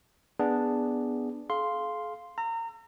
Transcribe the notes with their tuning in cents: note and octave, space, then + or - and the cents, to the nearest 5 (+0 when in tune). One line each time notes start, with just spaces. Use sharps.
B3 +0 D4 +0 G#4 -10
G#4 +45 F5 +0 C6 +0
A#5 -30 E6 +30